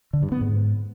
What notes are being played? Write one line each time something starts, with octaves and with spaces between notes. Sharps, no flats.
D3
G2
B3
G#2